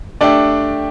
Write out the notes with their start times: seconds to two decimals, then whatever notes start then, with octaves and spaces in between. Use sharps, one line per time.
0.21 A3 D4 G4 D5